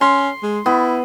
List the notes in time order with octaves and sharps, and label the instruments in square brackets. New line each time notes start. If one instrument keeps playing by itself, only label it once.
[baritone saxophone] C#4 [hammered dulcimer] C6
[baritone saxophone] G#3
[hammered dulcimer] B3 [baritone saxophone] E4